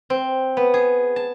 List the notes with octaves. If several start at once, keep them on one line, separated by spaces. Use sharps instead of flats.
C4
B3
G#4
A5